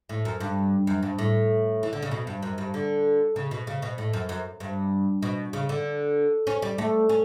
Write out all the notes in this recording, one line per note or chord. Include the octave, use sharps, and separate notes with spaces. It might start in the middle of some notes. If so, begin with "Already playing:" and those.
A2
F#2
G2
F#2
G2
A2
E3
D3
C#3
B2
G2
F#2
G2
D3
C#3
B2
C#3
B2
A2
F#2
F#2
G2
B2
C#3
D3
C#4
G3
A3
C#4